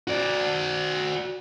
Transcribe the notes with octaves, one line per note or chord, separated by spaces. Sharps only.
F#4 D5